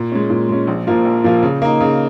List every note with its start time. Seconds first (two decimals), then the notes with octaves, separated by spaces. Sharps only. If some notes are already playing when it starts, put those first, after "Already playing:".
Already playing: A#2
0.12 G#3 C#4
0.30 A#2
0.49 G#3 C#4
0.67 A#1
0.87 A#2 F3 A#3 F4
1.05 A#1
1.24 A#2 F3 A#3 F4
1.43 C#3
1.62 A#3 D#4
1.81 C#3